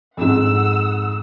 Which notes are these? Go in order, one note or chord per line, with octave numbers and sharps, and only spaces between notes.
F2 G#2 F#5 E6